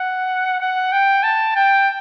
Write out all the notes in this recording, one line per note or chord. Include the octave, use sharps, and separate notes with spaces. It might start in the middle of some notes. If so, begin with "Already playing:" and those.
Already playing: F#5
F#5
G5
A5
G5